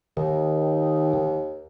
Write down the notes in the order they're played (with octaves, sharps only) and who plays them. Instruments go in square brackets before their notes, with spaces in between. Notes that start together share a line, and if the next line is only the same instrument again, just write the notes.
[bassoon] D#2 [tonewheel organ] D#3